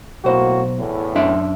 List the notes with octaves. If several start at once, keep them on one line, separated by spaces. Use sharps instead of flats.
B1 A2 A#3 F#4 C5
E2 A2
F#2 D4 E5